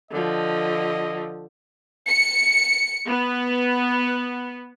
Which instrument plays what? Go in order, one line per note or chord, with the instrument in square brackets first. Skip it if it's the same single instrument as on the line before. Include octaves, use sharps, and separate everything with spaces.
[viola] D3 F3 [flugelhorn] D#5
[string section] C#7
B3